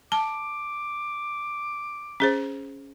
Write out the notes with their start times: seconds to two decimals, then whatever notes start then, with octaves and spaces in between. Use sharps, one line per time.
0.12 A5 D6
2.20 C#4 G#4 C5